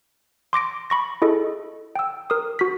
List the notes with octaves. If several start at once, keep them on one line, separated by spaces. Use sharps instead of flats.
C6 D6 A#6 D7
B5 C#6 A#6
E4 G#4 A4 D#5
G5 E6
A#4 D#6
F#4 B6